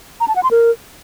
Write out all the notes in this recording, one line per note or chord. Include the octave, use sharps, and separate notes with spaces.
A#5
A5
F#5
C6
A#4